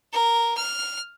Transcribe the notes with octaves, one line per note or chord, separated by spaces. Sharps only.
A#4
F6